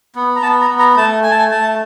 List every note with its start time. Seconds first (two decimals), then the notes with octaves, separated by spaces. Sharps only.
0.15 B3
0.36 A#5
0.42 B3 A5
0.61 A#5
0.70 B3
0.79 A#5
0.96 A3 A5
1.23 A3 G#5
1.31 A5
1.39 G#5
1.51 A3 A5